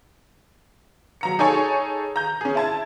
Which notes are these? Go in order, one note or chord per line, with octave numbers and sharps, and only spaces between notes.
F#3 A#5 C#7
D#4 G#4 A4 C#5 G#5 C#6
A#5 G6
C#4 G#4
E4 A5 G#6